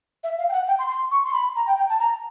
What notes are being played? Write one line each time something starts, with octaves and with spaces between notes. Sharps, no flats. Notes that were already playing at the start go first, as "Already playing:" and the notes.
E5
F5
G5
F#5
G5
C6
C6
C#6
C6
B5
A#5
G5
G5
A5
A#5